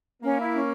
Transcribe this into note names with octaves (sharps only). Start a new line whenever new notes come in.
A#3 C#4
E4
C#4